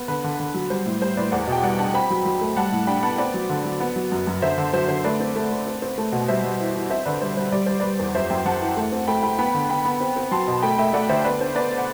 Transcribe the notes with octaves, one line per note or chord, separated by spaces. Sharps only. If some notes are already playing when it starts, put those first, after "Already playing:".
Already playing: B3
D3 B4
D3
D3
F#3
G3 C5
A2
G3 C5
A2 B4 D5
E2 D5 F#5
B2 G5
G3 D5 F#5
D4 F#5 A5
C4 G5 B5
F#3
F#3
A3
G3 F#5 A5
A2
D4 G5 B5
B3 F#5 A5
C4 B4 D5
F#3
D3
F#3
B3
F#3
F#2
F#2
D3 C5 E5
D3
F#3 C5
D3 C5
A3 B4 D5
C4
A3
A3
C4
C4
A3
B2
G3 C5 E5
G3
E3
E3
C4 C5 E5
D3 B4 D5
G3 C5
G3 C5
G3 D5
G3 C5
G3 B4 D5
E2
F#2 C5 E5
F#2 E5 G5
F#2 F#5 A5
E3
A3
C4
A3 G5 B5
A3 G5 B5
B3 G5 B5
D3
B3 G5 B5
B3
C4
C4
F#3 A5 C6
B2
A3 G5 B5
A3 E5 G5
A3 D5 F#5
D3 C5 E5
B3 B4 D5
D4 C5
B3 B4 D5
F#5